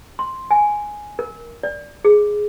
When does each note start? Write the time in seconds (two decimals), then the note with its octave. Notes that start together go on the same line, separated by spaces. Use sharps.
0.19 C6
0.51 G#5
1.19 A#4
1.63 D5
2.05 G#4